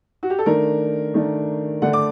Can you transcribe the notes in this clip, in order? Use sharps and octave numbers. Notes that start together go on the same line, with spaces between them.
F#4
G4
A4
D#3 A3 D4 A#4
D#3 A3 D4
D3 A3 D4 F#5
D6